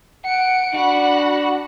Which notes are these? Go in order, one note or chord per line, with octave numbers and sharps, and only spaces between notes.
F#5 C#7 D7
D4 F#4 F#5 B5